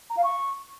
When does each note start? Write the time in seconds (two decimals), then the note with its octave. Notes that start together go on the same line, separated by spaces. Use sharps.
0.10 A#5
0.17 F5
0.24 C#6